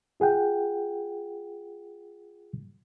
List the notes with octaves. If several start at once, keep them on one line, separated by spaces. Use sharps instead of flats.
F4 G#4 F#5 G5